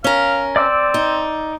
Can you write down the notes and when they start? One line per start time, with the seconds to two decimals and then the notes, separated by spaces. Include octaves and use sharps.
0.04 C#4 A#4 F5
0.56 C4 D5 D6 E6
0.94 D#4